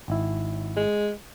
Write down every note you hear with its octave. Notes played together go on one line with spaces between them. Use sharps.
G#1 E4
G#3